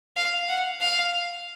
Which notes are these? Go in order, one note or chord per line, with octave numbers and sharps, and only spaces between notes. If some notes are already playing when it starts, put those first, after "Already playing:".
F5
F#5
F5